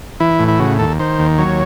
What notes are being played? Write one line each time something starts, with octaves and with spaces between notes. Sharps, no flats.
E3 E4
A2
E4
C#3 F#4
D#2 A4
D#3 C5
D#2
F#3 C#5